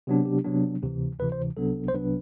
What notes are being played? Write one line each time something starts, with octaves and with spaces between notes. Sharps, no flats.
C3 F#3 B3 D4
G4
C3 F#3 B3 D4
D2 C3 E3
D2 C3 E3 B4
C5
C2 C3 F#3 B3 D4 A4
C5
C2 C3 F#3 B3 D4 B4